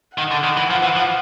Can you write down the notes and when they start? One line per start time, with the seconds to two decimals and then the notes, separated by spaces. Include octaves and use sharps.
0.18 D#3 F#5
0.31 D3
0.43 D#3
0.57 E3
0.70 F3
0.83 E3
0.96 F3